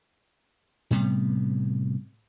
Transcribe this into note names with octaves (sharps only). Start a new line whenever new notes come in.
A2 C3 G3 B3